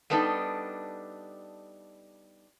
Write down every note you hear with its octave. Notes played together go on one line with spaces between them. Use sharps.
G3 A3 B3 D4 D#4 A4